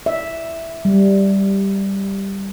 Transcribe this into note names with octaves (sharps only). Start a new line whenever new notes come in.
E5
G3